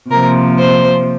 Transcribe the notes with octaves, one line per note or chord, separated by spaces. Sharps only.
C3 F3 A#3 A#4
C5